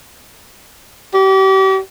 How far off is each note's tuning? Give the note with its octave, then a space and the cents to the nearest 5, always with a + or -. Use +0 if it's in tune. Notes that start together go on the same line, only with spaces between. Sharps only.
G4 -35